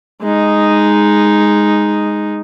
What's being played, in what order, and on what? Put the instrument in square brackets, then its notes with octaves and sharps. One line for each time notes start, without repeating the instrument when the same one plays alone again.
[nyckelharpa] G#3 D#4